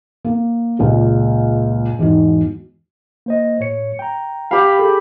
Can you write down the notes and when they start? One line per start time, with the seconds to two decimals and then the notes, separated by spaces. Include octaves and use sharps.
0.25 A#3
0.79 C#2 A#2 G#3
1.99 E2 G#2 F#4
3.26 A#3 C5 D#5
3.60 A2 C#5 C#7
3.99 G5 A#5
4.51 G4 F5 B5
4.79 G#4 A4